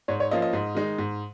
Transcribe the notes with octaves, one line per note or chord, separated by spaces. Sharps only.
G#2 C#5
C#5
F3 A#3 C#4 F4 D#5
D#5
G#2
D#3 G#3 D#4
G#2